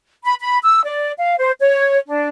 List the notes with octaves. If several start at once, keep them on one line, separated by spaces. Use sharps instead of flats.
B5
B5
E6
D5
F5
C5
C#5
D4